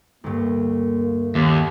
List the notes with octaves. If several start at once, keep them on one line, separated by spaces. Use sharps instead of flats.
D2 G2 A#3
D#2 C4